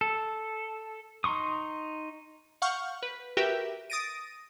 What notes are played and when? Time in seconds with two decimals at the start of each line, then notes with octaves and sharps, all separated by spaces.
0.01 A4
1.24 D#4 A#5 C6 C#6 D#6
2.62 F5 F#5 C#6 F6 G6
3.03 B4
3.37 F#4 G4 A#4 B4 E5 G5
3.90 D#6 A6 A#6 D7 D#7